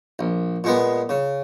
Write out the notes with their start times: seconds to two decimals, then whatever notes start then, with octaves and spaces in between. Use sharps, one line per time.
0.19 A#1
0.64 A#2 G#3 B3
1.09 C#3